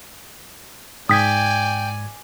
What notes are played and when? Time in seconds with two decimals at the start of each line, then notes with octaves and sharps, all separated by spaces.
1.09 G#2 D5 G5 G#5 D#6 G#6 B6